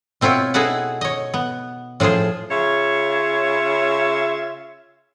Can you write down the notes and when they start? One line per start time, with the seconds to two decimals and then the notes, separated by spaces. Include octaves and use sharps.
0.21 B2 C4 E4 F4 C#5
0.54 D#4 E4 G#4 A4 B4 F#5
1.01 C#5 D#5
1.34 B3
2.00 A2 F3 F4 G#4 C5
2.50 C#3 F4 C#5 E5